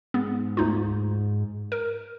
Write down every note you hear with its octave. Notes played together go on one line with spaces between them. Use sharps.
G#2 B3
D2 D#4 F4
A#4